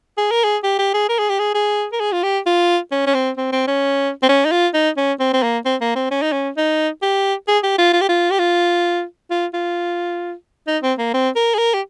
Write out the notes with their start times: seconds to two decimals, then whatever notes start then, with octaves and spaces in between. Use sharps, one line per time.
0.17 G#4
0.31 A#4
0.44 G#4
0.63 G4
0.79 G4
0.94 G#4
1.09 A#4
1.19 G#4
1.29 G4
1.39 G#4
1.54 G#4
1.92 A#4
2.00 G#4
2.12 F4
2.23 G4
2.46 F4
2.91 C#4
3.07 C#4
3.14 C4
3.37 C4
3.52 C4
3.67 C#4
4.23 C4
4.29 C#4
4.45 D#4
4.51 F4
4.74 D#4
4.97 C#4
5.19 C4
5.33 C4
5.43 A#3
5.65 C4
5.81 A#3
5.95 C4
6.11 C#4
6.22 D#4
6.32 C#4
6.57 D#4
7.02 G4
7.48 G#4
7.63 G4
7.78 F4
7.93 F4
8.01 G4
8.09 F4
8.31 G4
8.39 F4
9.30 F4
9.53 F4
10.67 D#4
10.83 C4
10.98 A#3
11.13 C4
11.36 A#4
11.54 G#4
11.58 A#4
11.74 G4